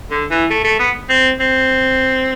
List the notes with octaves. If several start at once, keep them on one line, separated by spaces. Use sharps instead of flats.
D3
E3
A3
A3
B3
C4
C4